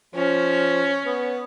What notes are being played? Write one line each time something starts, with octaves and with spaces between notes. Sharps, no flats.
F3 C#4
B3